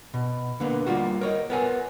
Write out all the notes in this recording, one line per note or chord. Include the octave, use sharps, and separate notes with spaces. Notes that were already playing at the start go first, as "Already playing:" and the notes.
B2
D3 A#3 B3
G3 A#3 F4 F#4
A#4 C#5 D#5
B3 A#4 G#5